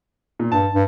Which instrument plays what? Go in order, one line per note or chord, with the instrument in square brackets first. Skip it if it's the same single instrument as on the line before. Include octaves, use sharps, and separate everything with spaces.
[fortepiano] A#2
[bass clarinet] G2 [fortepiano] A5
[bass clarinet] G2